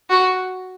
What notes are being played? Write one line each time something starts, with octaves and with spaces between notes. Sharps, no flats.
F#4